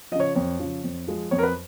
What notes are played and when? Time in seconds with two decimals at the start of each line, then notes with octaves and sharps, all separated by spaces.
0.12 F3 D#5
0.15 C#3 C#5
0.35 F2 C#5
0.59 C#3 F3
0.84 F2
1.07 F3 G#3
1.31 F2 C#5
1.38 A#4
1.43 B4